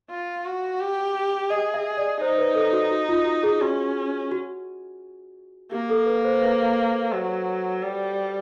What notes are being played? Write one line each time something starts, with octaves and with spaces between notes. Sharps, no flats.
F4
F#4
G4
G#4 D#5
E5
D#5
D5
D#4 C5
B4
A4
F#4
F#4
F4
F#4
G#4
C#4 F#4
F#4
A#3 G4
A4
B4
C5
B4
F#3
G3